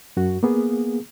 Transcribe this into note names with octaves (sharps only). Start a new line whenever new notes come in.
F#2 F#4
A#3 B3 G#4